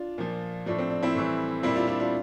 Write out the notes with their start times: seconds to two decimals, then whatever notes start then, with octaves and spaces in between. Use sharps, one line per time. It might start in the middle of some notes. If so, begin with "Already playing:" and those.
Already playing: D4 F4
0.18 A#2 F3
0.66 A2 F3 D4
0.78 C4
0.90 D4
1.03 C4 E4
1.15 A2 E3 G3
1.63 A#2 G3 C4 E4
1.76 D4 F4
1.87 D4 F4
2.00 D4 F4